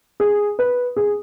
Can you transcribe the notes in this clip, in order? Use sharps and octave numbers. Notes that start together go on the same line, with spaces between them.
G#4
B4
G#4